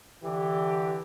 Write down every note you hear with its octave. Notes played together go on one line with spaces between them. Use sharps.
D3 E3 D4 G4